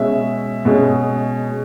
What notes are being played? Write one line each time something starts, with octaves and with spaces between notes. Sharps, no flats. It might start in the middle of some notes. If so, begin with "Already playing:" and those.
Already playing: B2 G#3 C#4 E5
B2 G#3 C#4